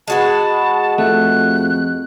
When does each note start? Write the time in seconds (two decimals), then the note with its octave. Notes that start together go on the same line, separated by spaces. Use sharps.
0.08 G#3 F#4 B4 A5
0.98 F2 A3 F#6